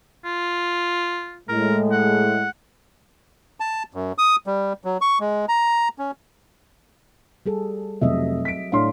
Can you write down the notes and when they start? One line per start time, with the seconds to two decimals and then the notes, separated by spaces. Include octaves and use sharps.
0.25 F4
1.49 A2 G#3 A#4
1.92 F#5
3.60 A5
3.94 F#2
4.18 D#6
4.47 G3
4.84 F#3
5.01 C#6
5.20 G#3
5.48 A#5
5.99 C#4
7.46 G3 G#4 A4
8.01 F1 F#3 D#5 E5
8.45 B6 D7
8.72 A2 D4 C#5 F5 C6